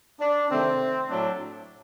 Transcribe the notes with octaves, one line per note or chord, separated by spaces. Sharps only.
D4
C3 D#3 A3 C4
A2 F#3 A3 D4